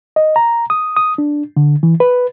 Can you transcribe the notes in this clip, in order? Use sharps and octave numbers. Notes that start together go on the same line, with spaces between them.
D#5
A#5
D#6
D#6
D4
D3
E3
B4